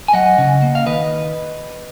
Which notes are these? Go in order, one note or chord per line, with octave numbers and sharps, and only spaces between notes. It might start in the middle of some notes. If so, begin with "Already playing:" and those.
G#5
F#3 D#5 F#5
C#3
A#3
F5
D#3 B4 D#5